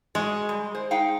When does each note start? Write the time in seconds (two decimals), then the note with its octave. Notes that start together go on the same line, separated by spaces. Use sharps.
0.15 G#3 F#4 D#5
0.49 G3
0.75 C5
0.91 D#4 F5 G5